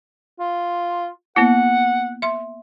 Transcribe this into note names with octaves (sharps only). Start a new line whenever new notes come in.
F4
A#3 B3 E4 F#5
E5 C6